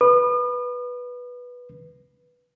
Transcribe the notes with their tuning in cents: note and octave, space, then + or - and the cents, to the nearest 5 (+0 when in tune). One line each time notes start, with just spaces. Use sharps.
B4 -5 D#6 -45